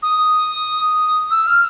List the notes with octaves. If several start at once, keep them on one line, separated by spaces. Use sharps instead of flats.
D#6
E6
F6